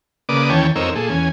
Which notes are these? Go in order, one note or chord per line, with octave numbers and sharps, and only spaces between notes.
C#3 A#3 B4 D5 D6 D#6
D#2 E3 C#4 C#5 G5 A5
F2 C4 D#4 A#4 C#5 E6
A#2 G#4 A4
E2 C#4 G#5